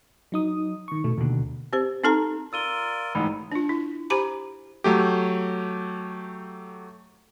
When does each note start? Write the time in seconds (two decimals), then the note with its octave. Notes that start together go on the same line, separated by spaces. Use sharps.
0.32 F#3 D#4 D#6
0.88 D#3 C#6
1.04 B2 A3
1.18 D#2 B2 D3
1.73 C4 G4 C5
2.04 C4 D#4 A4 A5 A#5
2.53 F4 A#4 D5 E6 D#7 G7
3.15 A1 G#2 B5
3.52 D4 F4
3.69 E4
4.10 G4 C5 G#5 A#5 B5 D6
4.84 F#3 A3 G4